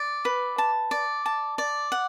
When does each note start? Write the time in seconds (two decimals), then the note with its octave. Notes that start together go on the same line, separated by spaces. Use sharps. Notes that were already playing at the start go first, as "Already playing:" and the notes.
Already playing: D5
0.25 B4
0.58 A5
0.91 D5
1.26 A5
1.58 D5
1.92 F#5